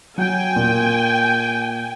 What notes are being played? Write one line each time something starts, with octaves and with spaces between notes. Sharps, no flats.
F#3 G5 G#5
A#2